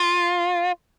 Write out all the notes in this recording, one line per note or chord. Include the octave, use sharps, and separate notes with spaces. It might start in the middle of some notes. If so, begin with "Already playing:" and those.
Already playing: F4